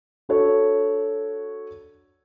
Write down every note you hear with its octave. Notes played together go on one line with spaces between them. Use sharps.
D4 F#4 A4 C#5